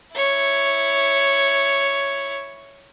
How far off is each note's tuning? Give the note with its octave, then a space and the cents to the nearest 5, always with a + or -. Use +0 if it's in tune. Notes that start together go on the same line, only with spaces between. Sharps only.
E4 +0 C#5 +0